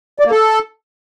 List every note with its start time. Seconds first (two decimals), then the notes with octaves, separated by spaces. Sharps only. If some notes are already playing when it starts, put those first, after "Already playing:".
0.19 D5
0.25 A#3
0.31 A4